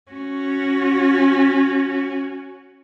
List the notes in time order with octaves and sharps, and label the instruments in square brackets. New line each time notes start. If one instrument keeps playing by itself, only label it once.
[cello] C#4 F#4